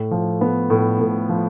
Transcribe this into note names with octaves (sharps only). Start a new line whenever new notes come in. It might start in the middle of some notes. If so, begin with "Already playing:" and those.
Already playing: A2
F3
B3
A2
A2
F3